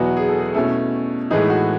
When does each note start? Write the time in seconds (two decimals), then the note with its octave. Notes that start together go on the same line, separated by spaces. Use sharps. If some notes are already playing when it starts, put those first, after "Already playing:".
Already playing: E2 B2 F#3 B3 E4 F#4
0.17 G#4
0.29 A4
0.40 G#4
0.55 B2 A3 C#4 E4 A4
1.31 A2 E3 G#3 B3 D#4 G#4
1.50 F#4